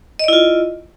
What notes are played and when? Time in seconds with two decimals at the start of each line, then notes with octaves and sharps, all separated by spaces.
0.19 D#5
0.24 D5
0.28 E4
0.33 F4